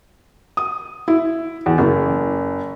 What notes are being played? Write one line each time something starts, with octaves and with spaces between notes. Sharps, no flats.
D#6
E4
E2
F#1